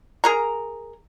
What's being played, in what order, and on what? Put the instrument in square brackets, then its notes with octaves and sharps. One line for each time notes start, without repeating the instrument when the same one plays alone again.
[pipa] G#4 A#4 A#5